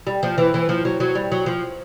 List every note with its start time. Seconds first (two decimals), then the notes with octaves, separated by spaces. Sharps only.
0.07 G3
0.23 F3
0.38 E3
0.54 E3
0.69 F3
0.85 F#3
1.00 F#3
1.15 G3
1.32 F#3
1.46 F3